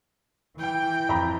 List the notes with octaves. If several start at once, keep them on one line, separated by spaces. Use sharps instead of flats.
E3 G5
F2 A#5 B5